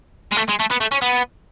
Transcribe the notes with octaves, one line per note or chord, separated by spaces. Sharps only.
G#3
A3
G#3
A3
B3
A3
C#4
B3